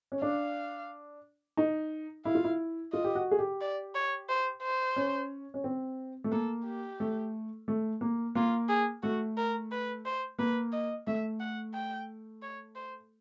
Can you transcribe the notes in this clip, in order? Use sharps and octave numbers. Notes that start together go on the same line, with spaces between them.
C#4
D4 F5
D#4
E4 F5
F4
E4
F4 D#5
G4
F#4
G#4
G4
D5
C#5
C5
C5
C#4
C#4
C4
A3
A#3 A4
G4
A3
A3
A#3
A#3 F4
G#4
A3 F#4
A#4
B4
C5
A#3 B4
D#5
A3 E5
F#5
G5
C#5
C5